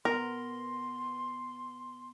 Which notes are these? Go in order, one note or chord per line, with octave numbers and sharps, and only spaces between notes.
B3 A#4 C6